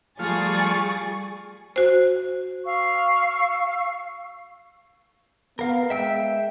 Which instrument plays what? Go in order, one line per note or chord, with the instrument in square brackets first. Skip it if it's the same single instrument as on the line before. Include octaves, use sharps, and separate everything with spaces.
[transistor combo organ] F3 A3 F4 [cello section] G3 [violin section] G#4 C#6 A6
[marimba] F#4 C5
[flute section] F5 C#6 E6
[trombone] B3 [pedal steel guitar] A#4 F5
[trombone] G#3 [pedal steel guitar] E5 G5 E6